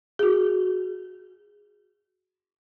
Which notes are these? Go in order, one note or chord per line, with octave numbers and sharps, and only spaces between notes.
F#4 G#4